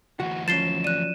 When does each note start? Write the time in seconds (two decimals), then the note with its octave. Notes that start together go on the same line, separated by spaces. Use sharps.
0.20 D2 E3 F#4
0.48 F3 F#3 C#4 A6 C7 E7 G7
0.84 D5 F#6 D#7